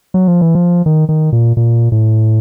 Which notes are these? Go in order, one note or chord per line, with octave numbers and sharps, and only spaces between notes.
F#3
F3
E3
F3
D#3
D#3
A#2
A#2
A2